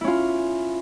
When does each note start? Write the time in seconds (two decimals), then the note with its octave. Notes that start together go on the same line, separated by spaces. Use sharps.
0.01 E4
0.04 C#4
0.07 F4